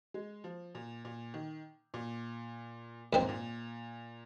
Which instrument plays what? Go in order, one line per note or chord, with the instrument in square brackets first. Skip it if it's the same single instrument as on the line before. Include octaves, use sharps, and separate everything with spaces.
[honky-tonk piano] G#3
F3
A#2
A#2
D#3
A#2
[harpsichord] D#2 D#3 C4 [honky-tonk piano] A#2
[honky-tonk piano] G#2
A#2